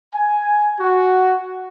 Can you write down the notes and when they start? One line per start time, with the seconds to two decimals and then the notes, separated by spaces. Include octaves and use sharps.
0.13 G#5
0.78 F#4